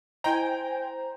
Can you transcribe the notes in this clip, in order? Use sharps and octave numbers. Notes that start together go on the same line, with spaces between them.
E4 C5 D#5 G5 G#5 A#5